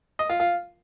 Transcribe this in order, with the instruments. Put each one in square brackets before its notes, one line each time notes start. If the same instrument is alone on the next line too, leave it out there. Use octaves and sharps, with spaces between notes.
[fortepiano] D#5
F4
F4